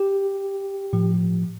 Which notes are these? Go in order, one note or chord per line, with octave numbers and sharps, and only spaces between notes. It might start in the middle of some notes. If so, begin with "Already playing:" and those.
Already playing: G4
A2 F3